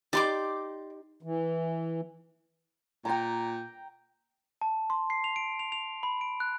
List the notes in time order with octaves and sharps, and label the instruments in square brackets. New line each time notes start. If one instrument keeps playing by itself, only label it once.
[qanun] D#4 G4 [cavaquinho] D5 C6 D6
[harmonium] E3
[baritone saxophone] A#2 [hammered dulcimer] G5 A#5
[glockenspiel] A5
C6
C7
F7
D7
F7
F7
B5
D7
F#6